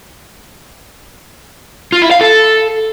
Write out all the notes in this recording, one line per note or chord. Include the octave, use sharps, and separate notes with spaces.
F4
E4
F5
A4